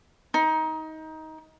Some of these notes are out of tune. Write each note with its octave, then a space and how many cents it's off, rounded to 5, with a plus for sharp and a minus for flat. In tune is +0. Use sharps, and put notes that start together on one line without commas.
D#4 +20